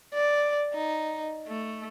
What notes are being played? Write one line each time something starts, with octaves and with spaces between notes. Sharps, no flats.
D5
D#4
A3